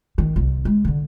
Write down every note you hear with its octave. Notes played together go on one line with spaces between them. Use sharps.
D#3
C2 C4
G#3
D3 D#3